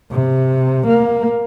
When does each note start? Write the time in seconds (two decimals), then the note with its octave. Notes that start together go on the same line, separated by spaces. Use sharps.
0.11 C3
0.87 A#3